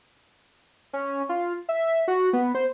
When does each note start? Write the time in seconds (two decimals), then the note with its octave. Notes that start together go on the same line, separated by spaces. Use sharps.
0.93 C#4
1.29 F4
1.69 E5
2.08 F#4
2.33 B3
2.55 C5